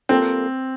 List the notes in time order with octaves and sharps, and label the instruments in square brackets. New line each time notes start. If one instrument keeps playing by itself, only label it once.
[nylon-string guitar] G3 A#3 F4 A4 [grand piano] C4